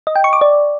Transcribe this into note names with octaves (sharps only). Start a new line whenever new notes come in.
D#5
G5
C#6
D6
D5